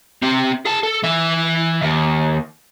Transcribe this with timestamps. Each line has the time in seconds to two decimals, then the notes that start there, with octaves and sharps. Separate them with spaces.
0.23 C4 G4
0.65 G#4 A5
0.83 A4
1.03 E3 E5
1.82 D#2